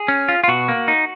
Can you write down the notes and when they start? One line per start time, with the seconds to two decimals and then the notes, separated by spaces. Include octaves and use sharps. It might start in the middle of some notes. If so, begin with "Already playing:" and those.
Already playing: G#4
0.08 C#4
0.29 F4
0.44 F4
0.48 B2 F#4
0.68 A#3
0.88 D#4